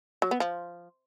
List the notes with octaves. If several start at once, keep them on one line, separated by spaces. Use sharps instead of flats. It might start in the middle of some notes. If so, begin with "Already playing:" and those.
F#3
B3
F3